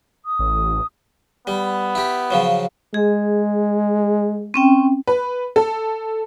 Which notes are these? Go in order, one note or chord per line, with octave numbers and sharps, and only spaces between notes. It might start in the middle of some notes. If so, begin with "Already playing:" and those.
D#6
A1
G3 B3
E4 G4
C#3 F3 F#3
G#3 G#4
C4 C#4 G5
B4
A4